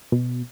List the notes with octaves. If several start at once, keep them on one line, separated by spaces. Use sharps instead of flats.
B2